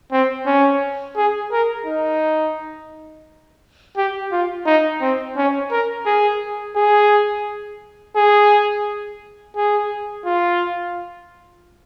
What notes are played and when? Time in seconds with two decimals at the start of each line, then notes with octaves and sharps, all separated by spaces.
0.12 C4
0.46 C#4
1.16 G#4
1.52 A#4
1.86 D#4
3.97 G4
4.32 F4
4.66 D#4
5.01 C4
5.37 C#4
5.71 A#4
6.06 G#4
6.76 G#4
8.16 G#4
9.56 G#4
10.26 F4